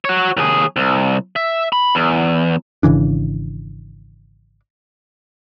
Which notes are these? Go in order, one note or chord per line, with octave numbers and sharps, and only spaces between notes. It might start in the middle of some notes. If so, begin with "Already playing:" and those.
F#4 C#5
D#2 G#4
C2
E5
B5
E2
G#1 C#3 E3 D4